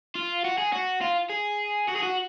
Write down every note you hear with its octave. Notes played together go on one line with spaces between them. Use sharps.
F4
F#4
G#4
F#4
F4
G#4
F#4
G#4
F#4